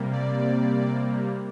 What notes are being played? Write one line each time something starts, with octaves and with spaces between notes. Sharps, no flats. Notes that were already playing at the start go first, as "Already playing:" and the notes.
Already playing: C3 G3 A#3
D5